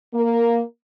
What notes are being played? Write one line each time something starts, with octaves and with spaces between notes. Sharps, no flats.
A#3